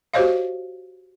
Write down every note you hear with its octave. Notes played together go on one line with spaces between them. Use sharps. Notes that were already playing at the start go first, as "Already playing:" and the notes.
F#4 G4 C5 C#5 D#5 F5